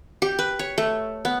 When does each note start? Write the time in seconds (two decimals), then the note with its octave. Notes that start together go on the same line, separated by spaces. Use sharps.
0.22 G4
0.39 B4
0.59 C#5
0.78 A3
1.25 B3